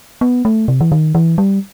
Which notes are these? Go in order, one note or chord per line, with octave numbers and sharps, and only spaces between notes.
B3
A3
C3
E3
D#3
E3
G3